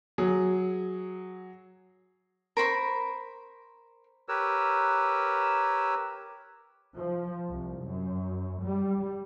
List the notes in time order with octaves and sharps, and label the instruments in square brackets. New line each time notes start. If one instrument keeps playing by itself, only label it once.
[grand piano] F#3 G#4
[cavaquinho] A#4 C5 B5 C#6
[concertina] G4 A#4 B4 C#5 E6
[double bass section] F3
C2
F#2
G3